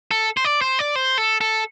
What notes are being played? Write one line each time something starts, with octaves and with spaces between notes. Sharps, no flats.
A4
C5
D5
C5
D5
C5
A4
A4